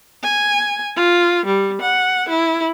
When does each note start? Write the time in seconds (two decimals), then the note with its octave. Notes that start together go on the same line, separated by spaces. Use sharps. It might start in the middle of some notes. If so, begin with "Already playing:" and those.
0.24 G#5
0.96 F4
1.46 G3
1.82 F#5
2.29 E4